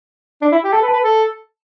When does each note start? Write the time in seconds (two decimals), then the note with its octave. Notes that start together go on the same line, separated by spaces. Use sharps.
0.42 D4
0.52 E4
0.64 G4
0.73 A4 A5
0.82 B4
0.88 A5
0.93 B4
1.04 A4